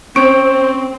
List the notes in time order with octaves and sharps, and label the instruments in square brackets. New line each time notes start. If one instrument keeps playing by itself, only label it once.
[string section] C4 [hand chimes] C#4 C#6 D7 [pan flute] C5